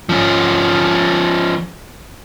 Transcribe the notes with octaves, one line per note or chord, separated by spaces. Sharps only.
F3 C#4